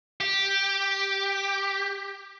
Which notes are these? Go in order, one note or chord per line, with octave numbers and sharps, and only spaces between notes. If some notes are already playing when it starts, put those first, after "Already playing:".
G4